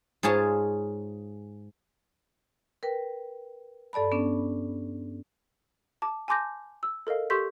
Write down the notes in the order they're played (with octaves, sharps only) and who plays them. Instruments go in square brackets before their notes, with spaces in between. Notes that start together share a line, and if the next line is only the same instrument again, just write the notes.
[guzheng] G#2 F4 G#4 C#5 A5
[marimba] A#4 B4 G5
G2 A4 D5 A5 B5
B3 C#4 D4
[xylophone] A5 D6
G#5 A5 C6 D6 G6 A#6
E6
A4 A#4 D#5 F5
G4 A4 C6 C#6 G6 B6